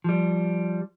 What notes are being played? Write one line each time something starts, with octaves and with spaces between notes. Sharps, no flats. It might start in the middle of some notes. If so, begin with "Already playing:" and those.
F3 G3